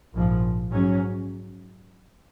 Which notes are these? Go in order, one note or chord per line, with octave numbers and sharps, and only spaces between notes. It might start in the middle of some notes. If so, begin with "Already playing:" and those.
A#1 G#2 F3
G#2 F#3 C#4